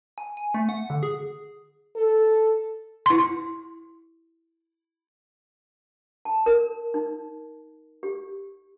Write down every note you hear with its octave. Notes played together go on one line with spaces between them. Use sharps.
G#5
G#5
A3
F#5
D3
G#4
A4
E4 C6
A5
A#4
D#4
G4